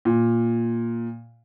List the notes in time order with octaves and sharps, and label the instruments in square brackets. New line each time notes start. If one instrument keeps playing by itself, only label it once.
[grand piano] A#2